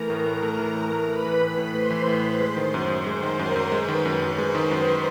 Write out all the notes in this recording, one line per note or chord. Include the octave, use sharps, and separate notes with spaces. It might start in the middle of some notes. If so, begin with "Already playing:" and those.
Already playing: E3 A3 A#4 A#5
A2
A2
A3 A#4 A#5
E3
A2
A2
A3 B4 B5
E3
A2
A2
A3 C5 C6
E3
A2
A2
G#3 C5 C6
D#3
F#2
F#2
G#3 C5 C6
D#3
F#2 A#4 A#5
F#2
G#3 B4 B5
D#3
F#2
F#2
G#3 C5 C6
D#3
F#2